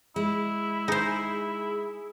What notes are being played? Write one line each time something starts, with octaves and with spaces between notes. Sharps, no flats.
G#3 E4
D#4 G#4 C5